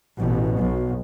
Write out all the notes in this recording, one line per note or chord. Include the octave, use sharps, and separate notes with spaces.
A1 B2
B1